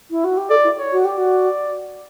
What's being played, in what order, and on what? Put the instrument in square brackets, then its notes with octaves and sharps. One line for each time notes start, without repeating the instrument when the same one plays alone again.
[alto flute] E4
F#4
G4
[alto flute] A4 [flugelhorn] D5
[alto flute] E4
[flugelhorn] C#5
[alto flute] F#4
[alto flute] G4 [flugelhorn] D5
[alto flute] F#4